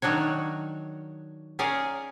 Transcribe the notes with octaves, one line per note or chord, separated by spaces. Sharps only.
D#3 F#3 D4 F#4 C#5
C#4 G#4 A#4 D5 F5